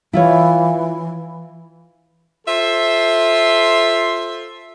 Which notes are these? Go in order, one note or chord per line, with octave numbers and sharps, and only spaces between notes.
E3 E4 F4 C#5
F4 A4 C5 E5 C6